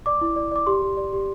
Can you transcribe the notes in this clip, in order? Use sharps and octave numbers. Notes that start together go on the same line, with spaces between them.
D5 D6
E4
D5
D5 D6
G4 C6
G4
D5
G4